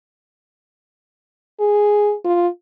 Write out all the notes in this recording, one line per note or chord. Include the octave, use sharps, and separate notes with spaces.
G#4
F4